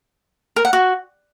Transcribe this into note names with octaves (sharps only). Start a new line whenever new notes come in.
A#4
F#5
F#4